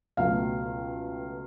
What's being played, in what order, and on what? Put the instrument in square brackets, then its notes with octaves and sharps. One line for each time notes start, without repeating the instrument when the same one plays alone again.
[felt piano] C#2 B2 F#3 A3 F5